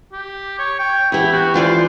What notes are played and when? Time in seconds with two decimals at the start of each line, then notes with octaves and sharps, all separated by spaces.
0.12 G4
0.59 C#5
0.79 G5
1.12 E2 E4 G4
1.32 F#4
1.54 E3 F4 C5 D5